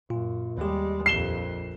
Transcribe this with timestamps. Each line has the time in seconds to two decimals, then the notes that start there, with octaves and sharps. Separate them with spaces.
0.10 F#2 A#2 F4
0.57 D#2 G3 G#3 G4
1.06 A#1 F2 C7 E7 G7